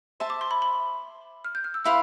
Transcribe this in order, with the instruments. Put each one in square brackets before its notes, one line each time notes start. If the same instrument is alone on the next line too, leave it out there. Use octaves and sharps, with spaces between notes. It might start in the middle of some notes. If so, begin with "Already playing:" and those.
[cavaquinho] C5 E5 A5
[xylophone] D6
C6
B5
B5
F6
G6
F6
E6
[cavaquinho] E4 B4 F5 C6 [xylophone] E6